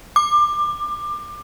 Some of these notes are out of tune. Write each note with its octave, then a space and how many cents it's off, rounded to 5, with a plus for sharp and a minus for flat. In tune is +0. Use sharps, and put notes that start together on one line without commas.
D6 +25